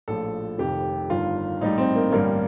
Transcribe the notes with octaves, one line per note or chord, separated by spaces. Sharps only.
A#1 A2 F3 A4
F1 F2 C3 D#3 G4
G1 G2 D#3 F4
A#1 A2 G3 D#4
C4
A#3
A1 G2 D3 G3 A#3